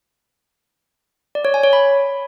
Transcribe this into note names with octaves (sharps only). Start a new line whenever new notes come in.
D5
C#5
G#5
C#5
B5